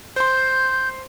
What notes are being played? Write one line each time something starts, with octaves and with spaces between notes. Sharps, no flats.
C5 C6 G6